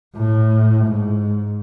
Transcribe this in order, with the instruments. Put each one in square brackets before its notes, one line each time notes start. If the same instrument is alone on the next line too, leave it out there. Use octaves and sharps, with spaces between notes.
[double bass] A2
G#2